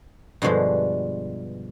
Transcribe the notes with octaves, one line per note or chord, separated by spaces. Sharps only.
G2 B2 D3 F3 G#3